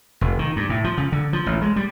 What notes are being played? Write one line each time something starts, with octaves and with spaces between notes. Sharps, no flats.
F1
D#3
G2
A2
F3
C#3
D3
F3
A1
G#3
G3